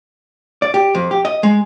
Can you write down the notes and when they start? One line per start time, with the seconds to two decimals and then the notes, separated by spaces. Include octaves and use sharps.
0.62 D5
0.74 G4
0.95 F2
1.11 G4
1.25 D#5
1.43 G#3